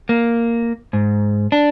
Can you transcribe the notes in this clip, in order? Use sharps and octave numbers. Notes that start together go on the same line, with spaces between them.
A#3
G#2
D4